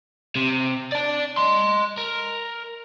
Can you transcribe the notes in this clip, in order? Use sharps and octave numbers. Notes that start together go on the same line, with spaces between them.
C3
D5 A5
D#5 C6
A#4